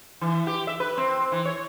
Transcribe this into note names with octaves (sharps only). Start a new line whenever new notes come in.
E3
G4
E5
B4
C4
E3
C#5